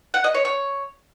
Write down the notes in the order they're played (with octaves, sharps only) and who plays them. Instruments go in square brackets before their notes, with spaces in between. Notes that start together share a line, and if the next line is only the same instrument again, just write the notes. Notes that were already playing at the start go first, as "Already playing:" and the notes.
[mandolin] F#5
D#5
C#5
C#5